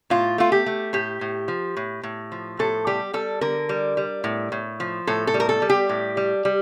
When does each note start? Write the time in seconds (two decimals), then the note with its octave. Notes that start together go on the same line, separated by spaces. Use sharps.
0.10 A2 F4
0.38 A3 F4
0.52 G4
0.66 A3
0.93 A2 G4
1.21 A2
1.48 F3
1.77 A2
2.03 A2
2.32 F3
2.59 A2 A4
2.87 G3 G4
3.13 G3 A4
3.41 D3 A#4
3.69 G3
3.97 G3
4.24 A2
4.52 A2
4.80 F3
5.07 A2 A4
5.27 A4
5.34 G3
5.40 A#4
5.49 A4
5.62 G3
5.70 G4
5.89 A2
6.17 G3
6.45 G3